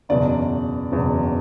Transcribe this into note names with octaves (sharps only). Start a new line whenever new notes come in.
F#1 E2 B2 D5
F#1 E2 B2